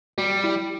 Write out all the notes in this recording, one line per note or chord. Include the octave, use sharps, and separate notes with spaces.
G3 F#4
E4